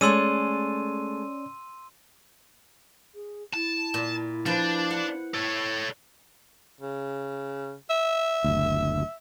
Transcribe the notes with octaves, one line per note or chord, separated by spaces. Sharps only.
G#3 A3 C#4 C#5 D5 C6 E6 D#7
G#4
E4 A5
A#2
F3 D4 B4
F#5
A4 C#5
C#3
E5
F#1 D2